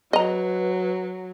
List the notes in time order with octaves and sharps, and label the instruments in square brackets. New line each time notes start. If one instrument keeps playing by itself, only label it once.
[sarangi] F#3 [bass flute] B4 [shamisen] D#5 A#5